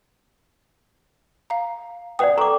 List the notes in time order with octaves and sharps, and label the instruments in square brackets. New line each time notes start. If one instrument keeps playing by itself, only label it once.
[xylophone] F5 A#5
[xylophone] B4 D#6 [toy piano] D5 F#5 G5
[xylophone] A4 G5 C#6 [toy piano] A#5 D6